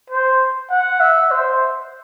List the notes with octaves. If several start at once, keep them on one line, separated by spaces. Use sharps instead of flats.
C5
F#5
E5
C5